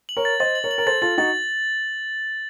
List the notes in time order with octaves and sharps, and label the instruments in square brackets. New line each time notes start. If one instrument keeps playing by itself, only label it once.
[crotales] F#7
[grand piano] A#4 C#5
[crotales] A6
[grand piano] C5 D#5 [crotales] A6
[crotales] F#7
[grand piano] A#4 C#5
[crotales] F#7
[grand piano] A#4
[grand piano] A4 C5 [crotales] A6
[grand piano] F4 A4 [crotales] A6
[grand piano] D#4 F#4 [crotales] A6